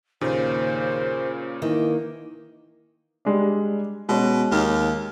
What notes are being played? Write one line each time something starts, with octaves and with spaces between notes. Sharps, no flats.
D#2 A#2 C#3 C5
D#3 E3 A#3
G3 G#3 D4
B2 G#3 C#4
D#2